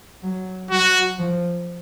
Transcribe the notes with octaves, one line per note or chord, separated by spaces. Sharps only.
F#3
F#3 F#4
F3